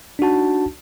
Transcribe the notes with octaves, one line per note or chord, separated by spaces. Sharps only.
D4 D#4 F#4 A5